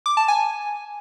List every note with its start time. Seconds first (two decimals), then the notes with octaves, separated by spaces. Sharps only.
0.06 D6
0.17 A5
0.28 G#5